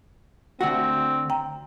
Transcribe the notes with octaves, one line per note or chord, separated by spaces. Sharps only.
D2 C4 F#4
G5 A#5